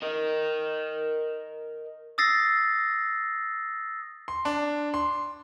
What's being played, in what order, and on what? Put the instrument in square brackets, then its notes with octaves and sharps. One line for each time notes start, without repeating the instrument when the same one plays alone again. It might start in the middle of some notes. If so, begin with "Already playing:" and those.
[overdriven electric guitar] A#4 D#5
[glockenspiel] D#6 E6 A6 A#6 C7
[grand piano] C6
D4
C6